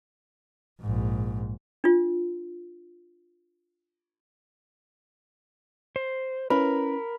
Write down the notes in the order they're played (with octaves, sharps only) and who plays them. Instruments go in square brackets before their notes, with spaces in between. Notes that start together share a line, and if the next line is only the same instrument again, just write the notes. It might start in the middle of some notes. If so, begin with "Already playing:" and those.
[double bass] A#1 G#2
[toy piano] D4 F4
[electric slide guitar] C5
[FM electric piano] C#4 E4 B4 [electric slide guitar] A#4 [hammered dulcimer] B5